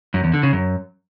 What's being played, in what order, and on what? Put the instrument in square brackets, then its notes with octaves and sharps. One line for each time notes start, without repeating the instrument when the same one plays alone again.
[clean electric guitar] F#2
E2
D3
C#3
F#2